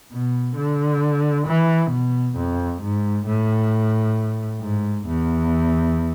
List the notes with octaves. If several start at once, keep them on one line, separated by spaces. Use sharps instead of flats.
B2
D3
E3
B2
F2
G#2
A2
G#2
E2